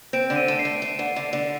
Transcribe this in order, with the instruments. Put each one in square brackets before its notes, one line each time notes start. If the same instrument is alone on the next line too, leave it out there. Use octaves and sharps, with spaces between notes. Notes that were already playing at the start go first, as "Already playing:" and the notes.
[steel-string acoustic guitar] C4 [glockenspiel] D7
[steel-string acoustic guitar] D3
[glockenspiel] D#7
[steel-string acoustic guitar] A3 [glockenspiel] D7
[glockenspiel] C7
[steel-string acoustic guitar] A3
A3
D3
D3
D3